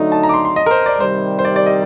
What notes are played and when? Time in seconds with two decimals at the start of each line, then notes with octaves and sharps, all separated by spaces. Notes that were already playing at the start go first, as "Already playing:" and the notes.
Already playing: D3 F#3 A3 D#4
0.12 A5
0.23 A#5
0.29 D6
0.34 C6
0.45 C6
0.56 D#5
0.66 A#4
0.71 C5
0.86 D5
1.00 C3 D#3 G3 C5
1.39 C5
1.45 D5
1.56 D5
1.66 D#5